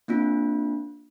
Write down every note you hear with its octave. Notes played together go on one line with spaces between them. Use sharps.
A#3 C4 D4 F4